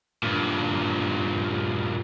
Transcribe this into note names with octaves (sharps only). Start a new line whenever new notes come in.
G2 A#2